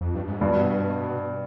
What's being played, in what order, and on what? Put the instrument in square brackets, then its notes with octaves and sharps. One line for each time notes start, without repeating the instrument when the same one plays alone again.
[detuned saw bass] F2
G2
G#2
[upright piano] G2 [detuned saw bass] B2